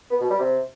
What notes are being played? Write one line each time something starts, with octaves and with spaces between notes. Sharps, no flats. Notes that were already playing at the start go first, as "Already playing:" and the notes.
B3
B2
G3
C3